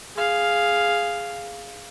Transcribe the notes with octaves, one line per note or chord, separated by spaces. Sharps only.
G#4 F5